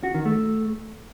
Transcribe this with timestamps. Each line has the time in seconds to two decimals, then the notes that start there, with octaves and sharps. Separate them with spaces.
0.03 F#4
0.14 D#3
0.25 A3